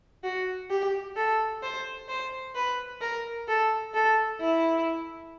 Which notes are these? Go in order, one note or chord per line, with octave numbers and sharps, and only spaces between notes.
F#4
G4
A4
C5
C5
B4
A#4
A4
A4
E4